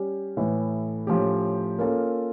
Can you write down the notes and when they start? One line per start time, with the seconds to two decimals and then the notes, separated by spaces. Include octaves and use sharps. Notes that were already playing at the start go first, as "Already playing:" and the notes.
Already playing: G3 C#4 G4
0.37 A2 E3 A3 E4
1.07 A2 F3 C#4 G4
1.79 A#3 C#4 F4 A4